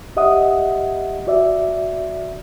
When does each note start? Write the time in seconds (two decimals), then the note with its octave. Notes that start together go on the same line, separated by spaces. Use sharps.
0.16 G4 D#5 E5 F#5 D#6
1.27 F#4 D5 E5